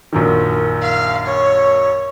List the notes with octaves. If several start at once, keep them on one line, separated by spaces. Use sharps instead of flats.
A#1 F#2 D#3
F5
C#5